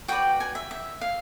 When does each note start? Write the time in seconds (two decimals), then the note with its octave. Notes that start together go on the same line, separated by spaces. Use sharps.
0.08 F#4 B4 D5 G5
0.40 G#5
0.55 E5
0.71 E5
1.01 F5